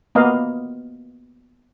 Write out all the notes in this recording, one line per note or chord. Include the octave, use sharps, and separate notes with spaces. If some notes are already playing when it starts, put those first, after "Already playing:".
A#3 B3 D#5 F5